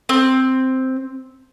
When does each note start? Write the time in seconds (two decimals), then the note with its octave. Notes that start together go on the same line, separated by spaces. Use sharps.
0.09 C4